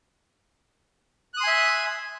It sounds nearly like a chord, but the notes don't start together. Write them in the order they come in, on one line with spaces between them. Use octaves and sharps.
F#6 D#6 C6 G#5 E5